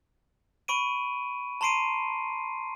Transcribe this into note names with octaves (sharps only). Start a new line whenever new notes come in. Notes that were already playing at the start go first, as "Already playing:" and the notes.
B5 C#6 D7 D#7
A5 A#5 C6 C7 D7 D#7